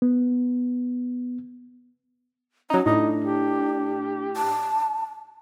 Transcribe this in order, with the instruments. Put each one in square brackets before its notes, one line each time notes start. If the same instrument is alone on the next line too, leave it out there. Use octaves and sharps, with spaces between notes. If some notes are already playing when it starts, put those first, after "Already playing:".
[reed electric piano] B3
[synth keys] F#3 D#4 [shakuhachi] C#4
[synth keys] A2 [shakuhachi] D4 [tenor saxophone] D#4
[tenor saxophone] G4
[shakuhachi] A5